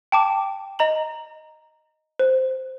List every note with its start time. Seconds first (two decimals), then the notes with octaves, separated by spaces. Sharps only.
0.12 G5 A5 D6
0.79 D#5 A#5 F#7
2.19 C5